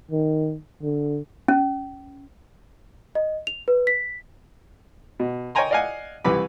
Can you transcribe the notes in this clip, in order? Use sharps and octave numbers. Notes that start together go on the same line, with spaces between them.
D#3
D3
C#4
D#5
F7
B4
B6
B2
C#5 D#5 G5 G#5 A#5 C6
D5 D#5 F5 F#5 G#5
C2 E3 B4 B5 D6